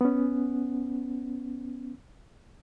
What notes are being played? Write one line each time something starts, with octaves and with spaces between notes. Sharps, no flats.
B3 C#4